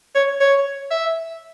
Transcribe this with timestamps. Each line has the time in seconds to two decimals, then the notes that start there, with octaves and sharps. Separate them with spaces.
0.15 C#5
0.40 C#5
0.91 E5